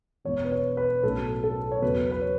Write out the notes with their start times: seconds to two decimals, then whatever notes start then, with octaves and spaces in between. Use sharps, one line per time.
0.25 E1 E2 E3 C#5
0.45 B4
0.52 C#5
0.77 B4
1.03 B1 A2 F#3 C#4 A4
1.44 A4
1.71 C#5
1.82 E2 C#3 F#3 B3 B4
2.11 B4
2.22 C#5